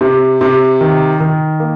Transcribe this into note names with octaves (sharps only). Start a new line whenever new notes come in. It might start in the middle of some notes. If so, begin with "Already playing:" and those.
C3
C3
D#3
D#3
A#3